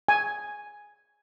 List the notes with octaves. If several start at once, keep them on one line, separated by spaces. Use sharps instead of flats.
G#5